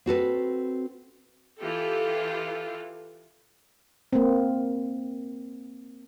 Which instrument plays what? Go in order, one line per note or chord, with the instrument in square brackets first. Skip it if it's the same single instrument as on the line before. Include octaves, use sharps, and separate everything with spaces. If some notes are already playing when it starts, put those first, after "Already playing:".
[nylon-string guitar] C4 F#4 A4 B4
[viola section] E3 F4 G4 A4
[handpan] A#3 C4